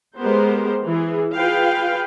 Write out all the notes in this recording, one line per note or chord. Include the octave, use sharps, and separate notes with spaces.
G#3 B3 G4 A#4 C5
E3 G#4
F4 G#4 B4 F5 G5